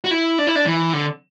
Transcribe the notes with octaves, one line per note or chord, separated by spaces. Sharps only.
F#4
E4
D4
E4
D4
E3
D3